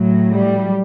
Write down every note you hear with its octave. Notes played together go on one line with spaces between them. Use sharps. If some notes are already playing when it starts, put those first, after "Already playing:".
Already playing: A2 F#3
G3